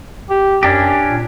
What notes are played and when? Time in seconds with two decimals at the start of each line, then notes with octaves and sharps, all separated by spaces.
0.30 G4
0.63 F#2 C#4 D4 G4
1.08 A#2